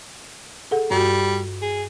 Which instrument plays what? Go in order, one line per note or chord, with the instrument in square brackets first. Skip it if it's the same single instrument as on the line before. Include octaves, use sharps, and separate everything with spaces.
[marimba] G#4 A4 F#5
[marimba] G2 F#4 [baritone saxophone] G3
[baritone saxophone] G#4